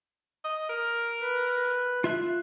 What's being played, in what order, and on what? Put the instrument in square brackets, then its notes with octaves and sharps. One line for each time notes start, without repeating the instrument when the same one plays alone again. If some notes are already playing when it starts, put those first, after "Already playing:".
[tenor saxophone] D#5
A#4
[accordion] B4
[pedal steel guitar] F4 E5 F#6